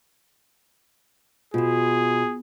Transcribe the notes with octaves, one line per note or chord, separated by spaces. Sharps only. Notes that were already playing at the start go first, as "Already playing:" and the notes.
B2 F4 F#4 G#4